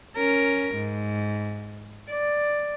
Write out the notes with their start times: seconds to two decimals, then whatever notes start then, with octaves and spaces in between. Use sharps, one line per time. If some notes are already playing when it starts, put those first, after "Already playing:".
0.16 C#4 A#4
0.74 G#2
2.10 D5